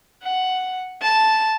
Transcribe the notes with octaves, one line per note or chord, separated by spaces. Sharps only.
F#5
A5